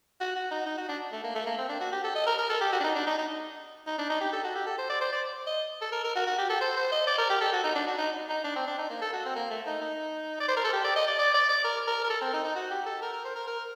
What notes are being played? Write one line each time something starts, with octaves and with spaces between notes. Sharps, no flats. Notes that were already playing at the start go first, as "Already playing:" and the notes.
F#4
F#4
D#4
D#4
F#4
D4
A3
A#3
A3
A#3
C4
D4
F#4
G4
A4
D#5
A#4
A#4
A4
G4
F#4
D4
D#4
D4
D#4
D#4
D#4
D4
D#4
G4
A4
F#4
G4
A4
C5
D5
C5
D5
D#5
A4
A#4
A#4
F#4
F#4
G4
A4
C5
C5
D#5
D5
A#4
G4
A4
F#4
D#4
D4
F#4
D#4
D#4
D4
C4
D4
D#4
A#3
A4
F#4
C4
A#3
A3
D#4
D#4
D5
C5
A#4
A4
G4
D5
D#5
D5
D5
D5
D5
A#4
A#4
A#4
A4
C4
D#4
D#4
F#4
G4
A4
A#4
A#4
C5
A#4
A#4